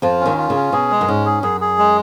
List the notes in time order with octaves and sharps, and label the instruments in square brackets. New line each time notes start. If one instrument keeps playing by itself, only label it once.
[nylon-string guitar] F2 F3 [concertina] F4
[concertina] C#4
[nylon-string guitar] D#2 D#3
[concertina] F4
[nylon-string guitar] C#3
[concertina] C#4
[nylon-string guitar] B2 [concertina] G#4
[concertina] G#3
[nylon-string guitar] F#2
[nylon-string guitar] G#2 [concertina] C#4
[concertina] G#4
[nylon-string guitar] F#2 [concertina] G#4
[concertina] G#4
G#3